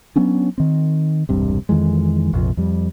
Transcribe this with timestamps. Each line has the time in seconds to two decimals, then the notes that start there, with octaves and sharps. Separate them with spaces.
0.16 F#3 B3 C#4 D4
0.58 D#3 C4
1.29 E1 C2 G2 C3
1.69 F2 D#3 E3 G#3
2.33 A#1 F2 C3 F3
2.57 F2 G3